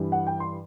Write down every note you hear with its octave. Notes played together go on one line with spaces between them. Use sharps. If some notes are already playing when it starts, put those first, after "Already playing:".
Already playing: G2 E3 G3
F#5
G5
C6